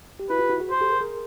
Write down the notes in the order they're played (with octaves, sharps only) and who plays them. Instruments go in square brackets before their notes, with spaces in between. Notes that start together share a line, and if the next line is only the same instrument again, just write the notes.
[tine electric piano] G4
[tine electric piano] E4 F#4 [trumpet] B4
[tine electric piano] F4 G4
E4 F#4
F#4 G#4
[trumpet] C5
[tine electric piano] G4 A4
G#4 A#4
G#4 A#4